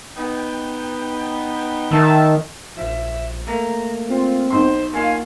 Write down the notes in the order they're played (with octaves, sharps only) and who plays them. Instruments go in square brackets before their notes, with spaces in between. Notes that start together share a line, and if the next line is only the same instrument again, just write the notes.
[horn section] B3 D#4 G5
[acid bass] D#3 [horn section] E5 A5
[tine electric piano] A#1 F3 [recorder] E5
[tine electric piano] A3 A#3 [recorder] A#5
[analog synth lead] C4 [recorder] F4
[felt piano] B1 C6 [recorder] C5
[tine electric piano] A#3 D#4 F4 [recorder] F5 [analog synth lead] G#5